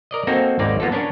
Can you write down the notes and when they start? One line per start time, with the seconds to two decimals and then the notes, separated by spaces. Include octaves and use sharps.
0.11 A#4 D5 D#5
0.27 A#3 C4 D#4 F#4 A4
0.59 G#1 D#2 A#3 D#4 D5 G5
0.80 A#3 B3 F4 G4 A4
0.92 C#4 D4 A#4 B4 C#5